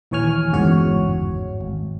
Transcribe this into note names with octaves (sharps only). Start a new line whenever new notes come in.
A#1 D#2 E3 C#5 G#5 F6
G1 E2 G#2 C#3 F#4 C#5
G#1